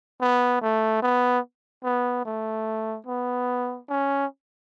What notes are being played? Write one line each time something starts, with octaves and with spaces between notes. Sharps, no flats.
B3
A3
B3
B3
A3
B3
C#4